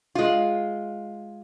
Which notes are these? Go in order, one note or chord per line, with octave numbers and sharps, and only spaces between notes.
G#3 F4